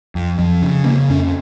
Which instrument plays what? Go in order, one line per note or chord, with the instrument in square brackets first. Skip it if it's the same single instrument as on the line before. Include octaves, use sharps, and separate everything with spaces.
[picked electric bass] F2
F2
C#3
C#3 A#3
F2 C#4